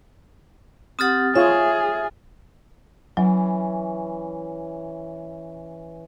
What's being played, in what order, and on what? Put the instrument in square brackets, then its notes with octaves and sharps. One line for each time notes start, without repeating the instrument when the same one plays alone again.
[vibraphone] C4 G4 F#5 [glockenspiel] D#6 F6 A6
[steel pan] F4 C#5 [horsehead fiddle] G#4 [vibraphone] E5
[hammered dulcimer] E3 C#4 [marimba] F#3